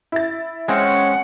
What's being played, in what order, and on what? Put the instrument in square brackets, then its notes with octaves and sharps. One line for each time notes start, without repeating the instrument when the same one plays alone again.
[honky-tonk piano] E4 A6
[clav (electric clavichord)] G#3 C4 [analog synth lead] C#4 [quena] F#5